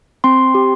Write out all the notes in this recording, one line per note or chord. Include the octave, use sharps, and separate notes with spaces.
C4 C6
G4